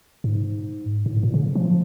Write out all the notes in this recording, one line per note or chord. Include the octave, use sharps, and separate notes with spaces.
G#2
G#2
A2
A#2
C#3
F3